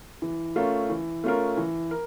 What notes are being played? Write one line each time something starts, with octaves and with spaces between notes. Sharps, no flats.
E3
A3 C#4 F4 A#4
E3
A3 C#4 F4 A#4
E3
A#4